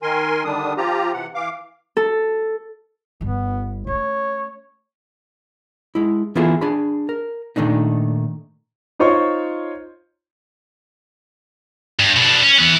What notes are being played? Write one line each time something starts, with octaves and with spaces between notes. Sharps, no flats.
D#3 A#4 G#5 C6
D3 D#3 G3 D4 D#6
F3 F4 G4 A#5
C3 E3 F#5
E3 F5 D6
A4
G1 G2 B3
A3 C#4 C#5
G#3 E4
E3 B3 E4 F4 G#4 A4
D4 G#4 B5
A#4
A#2 D#3 A3 D4 D#4
D#4 F4 C5 C#5 C#6
G2
B2 D4
C#4
E3 B3